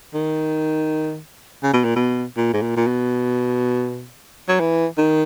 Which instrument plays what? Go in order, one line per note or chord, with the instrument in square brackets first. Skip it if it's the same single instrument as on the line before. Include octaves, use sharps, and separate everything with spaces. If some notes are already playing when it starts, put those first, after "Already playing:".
[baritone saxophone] D#3
C#3
B2
A#2
B2
A#2
G#2
A#2
A#2
B2
F#3
E3
D#3